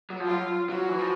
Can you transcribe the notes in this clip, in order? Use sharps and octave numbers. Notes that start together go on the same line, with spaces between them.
F#3
F3
F#3 F4
F#3 F#4
E3
F3